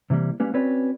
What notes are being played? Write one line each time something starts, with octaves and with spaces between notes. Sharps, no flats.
C3 E3 F#3 G3 A#3
G3 A#3 C#4 B4
C4 C#4 F#4 B4 C#5 D5